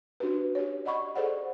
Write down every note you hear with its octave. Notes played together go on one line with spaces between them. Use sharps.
C#4 D4 F#4 G4 B4
G4 C#5
D5 D#5 F#5 B5 C#6
G#4 A4 C5 D5 F#5